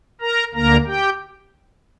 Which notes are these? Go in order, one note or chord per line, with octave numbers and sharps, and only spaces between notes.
A#4 A#5
D2 D3 A#3 A#4 A#5
G4 G5